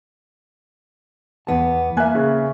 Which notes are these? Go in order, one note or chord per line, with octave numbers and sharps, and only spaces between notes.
E2 B3 A5
A#3 A#4 E5 G#5 F#6
C#3